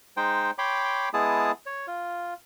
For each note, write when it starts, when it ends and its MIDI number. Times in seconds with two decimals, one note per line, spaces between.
0.17 0.51 56
0.17 0.51 63
0.17 0.51 72
0.17 0.51 79
0.58 1.09 73
0.58 1.09 79
0.58 1.09 83
0.58 1.09 84
0.58 1.09 86
1.14 1.52 56
1.14 1.52 59
1.14 1.52 64
1.14 1.52 68
1.14 1.52 81
1.14 1.52 87
1.66 1.86 73
1.87 2.34 65